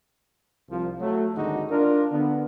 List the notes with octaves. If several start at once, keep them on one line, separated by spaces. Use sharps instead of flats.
C2 F3
F#3 A3
G#1 D#2 D3 G#3 D#4 F#4
D4 F4 A#4
D3 B3 D4